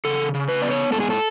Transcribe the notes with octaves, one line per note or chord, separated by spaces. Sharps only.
C#3 A4
C#3
B4
B3 D5
C#5
G#2 A4
G#4
A4